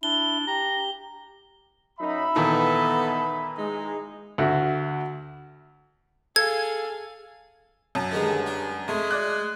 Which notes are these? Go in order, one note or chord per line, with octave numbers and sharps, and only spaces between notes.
D4 E4 G7
G4 A#5
F#2 D#4 E5 B5
A#2 D#3 E3 B3 D#4 A4
G#3 D#4
D2 F#4 E5
G#4 A4 F5 G#6
F#2 A5
G2 D3 D#3 G#3
D4
F2 G#3 A3
D5 F#6